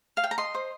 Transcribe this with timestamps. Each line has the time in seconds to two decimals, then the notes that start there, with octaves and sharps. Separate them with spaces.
0.17 F5
0.24 G5
0.31 A#5
0.38 D#5 C6
0.55 C5